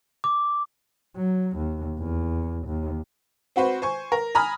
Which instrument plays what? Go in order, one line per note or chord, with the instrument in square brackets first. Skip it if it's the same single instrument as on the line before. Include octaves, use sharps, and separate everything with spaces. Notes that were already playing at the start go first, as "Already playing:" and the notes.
[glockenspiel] D6
[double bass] F#3
D#2
E2
D#2
[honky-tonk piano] C4 F#4 B4 C5
C5 G#5 C#6
A#4
G#5 A#5 B5 D#6 F6